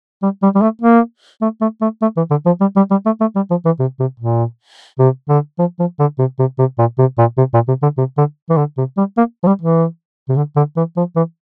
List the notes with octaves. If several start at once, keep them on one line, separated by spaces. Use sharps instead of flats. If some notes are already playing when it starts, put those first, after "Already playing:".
G3
G3
G3
A3
A#3
A3
A3
A3
A3
E3
D3
F3
G3
G3
G3
A3
A3
G3
F3
E3
C3
C3
A#2
C3
D3
F3
F3
D3
C3
C3
C3
A#2
C3
A#2
C3
A#2
C3
D3
C3
D3
E3
D3
C3
G3
A#3
F3
G3
E3
C3
D3
D3
E3
F3
E3